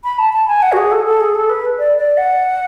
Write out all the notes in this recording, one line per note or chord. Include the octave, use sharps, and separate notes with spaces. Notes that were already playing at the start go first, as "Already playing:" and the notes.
B5
A5
A5
G#5
F#5
F#4
G#4
A4
A4
G#4
A4
B4
D5
D5
F#5